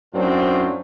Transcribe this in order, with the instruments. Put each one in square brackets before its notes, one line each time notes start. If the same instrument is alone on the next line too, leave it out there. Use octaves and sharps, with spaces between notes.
[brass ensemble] F#2 A2 F#3 C4 D4 F4